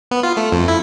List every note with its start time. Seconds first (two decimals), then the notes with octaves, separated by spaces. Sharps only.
0.11 B3
0.23 F4
0.37 A3
0.52 F2
0.68 E4